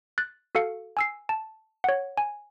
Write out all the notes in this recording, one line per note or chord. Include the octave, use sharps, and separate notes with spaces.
F#6 A6
F#4 A4 F5 C#7
G#5 E6 C7
A5
C#5 F#5
G#5